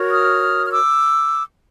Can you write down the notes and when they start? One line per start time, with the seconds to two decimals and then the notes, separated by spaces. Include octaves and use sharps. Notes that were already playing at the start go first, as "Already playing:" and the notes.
Already playing: F#4 A#4 C#5
0.10 D#6 F6
0.66 F6
0.70 D6 E6